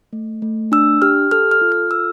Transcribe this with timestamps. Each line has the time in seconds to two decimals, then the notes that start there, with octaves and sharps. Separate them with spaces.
0.13 A3
0.42 A3
0.72 D4 E6
1.02 G4 F6
1.31 A4 F6
1.51 F6
1.61 F4
1.72 F6
1.91 A4 E6